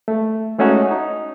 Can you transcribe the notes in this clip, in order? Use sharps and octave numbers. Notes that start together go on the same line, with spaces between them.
A3
G#3 A3 C#4 D#4 F#4
D#4